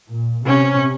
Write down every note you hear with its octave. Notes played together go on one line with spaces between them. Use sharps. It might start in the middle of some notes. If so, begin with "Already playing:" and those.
A#2
C3 C#4